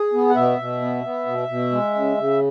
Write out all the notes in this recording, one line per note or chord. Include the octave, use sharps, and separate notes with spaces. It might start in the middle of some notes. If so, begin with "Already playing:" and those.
Already playing: G#4
B3
F#5
B2 E5
B2
B3
B3
B2
B2
G#3
C#3
C#3